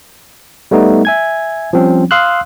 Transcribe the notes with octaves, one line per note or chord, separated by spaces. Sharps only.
G3 A3 B3 D#4
E5 G#5 G#6
F3 G3 C4 C#4
F5 C6 D#6 E6 F#6